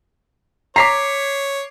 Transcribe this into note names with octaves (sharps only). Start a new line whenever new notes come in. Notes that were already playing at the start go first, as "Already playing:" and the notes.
C#5 A#5 D6 B6 C7